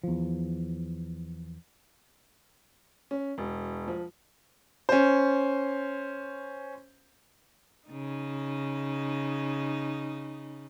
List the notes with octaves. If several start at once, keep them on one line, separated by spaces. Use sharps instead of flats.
E2 F3
C#4
E1
F3
C#4 C5
C#3 D#4